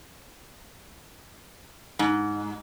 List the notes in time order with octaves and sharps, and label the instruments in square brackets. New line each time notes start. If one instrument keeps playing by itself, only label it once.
[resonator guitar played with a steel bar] G#2